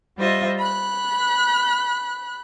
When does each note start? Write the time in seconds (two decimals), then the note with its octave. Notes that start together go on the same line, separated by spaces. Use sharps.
0.17 G3 F4 C5 D#5 E5
0.58 B5 F#6